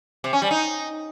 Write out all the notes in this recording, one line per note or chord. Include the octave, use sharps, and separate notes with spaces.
C3
C#4
G3
D#4